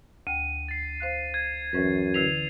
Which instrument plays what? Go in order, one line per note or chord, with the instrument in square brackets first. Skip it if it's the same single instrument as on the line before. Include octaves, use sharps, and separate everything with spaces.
[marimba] D2 G5 [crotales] D#7
[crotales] A6 C7
[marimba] C5 F5 F#6
[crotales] G#6
[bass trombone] F#2 [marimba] E3 C#4 B4
[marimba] D3 E4 B4 [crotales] C7 F7